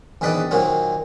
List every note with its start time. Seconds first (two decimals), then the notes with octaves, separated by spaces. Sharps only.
0.21 A#1 E2 D#3 B4 D5 D#5
0.51 A#2 D#3 F#3 A#3 C4